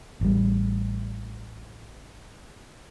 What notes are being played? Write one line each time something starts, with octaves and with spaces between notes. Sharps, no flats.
A1 G3